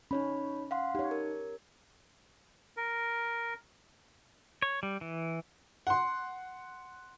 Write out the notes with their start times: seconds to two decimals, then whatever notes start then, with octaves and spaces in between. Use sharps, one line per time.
0.11 C#4 D#4 C#5 B5
0.71 F5 F#5 C6
0.95 D#4 G4 C#5
1.11 A#4
2.77 A#4
4.62 C#5
4.83 G3
5.01 E3
5.87 F#5 C6